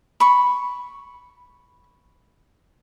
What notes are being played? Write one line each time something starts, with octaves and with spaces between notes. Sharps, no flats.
B5 C#6